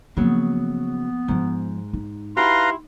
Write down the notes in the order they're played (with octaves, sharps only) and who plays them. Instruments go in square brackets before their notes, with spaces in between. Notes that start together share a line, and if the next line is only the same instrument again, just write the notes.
[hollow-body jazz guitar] C#3 F#3 [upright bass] F3 A#3 [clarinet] B3
[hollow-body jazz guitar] G#2 [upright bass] F3 G#3
[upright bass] D#4
[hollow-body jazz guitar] E4 F#4 G4 [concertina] B4 F5 A#5 [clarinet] C6